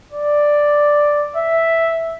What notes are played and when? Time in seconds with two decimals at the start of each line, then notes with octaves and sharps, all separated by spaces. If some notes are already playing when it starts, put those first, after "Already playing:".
0.13 D5
1.36 E5